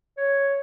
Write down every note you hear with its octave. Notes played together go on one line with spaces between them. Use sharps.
C#5